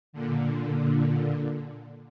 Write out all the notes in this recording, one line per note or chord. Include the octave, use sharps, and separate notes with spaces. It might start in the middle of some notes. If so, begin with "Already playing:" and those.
A#2 D3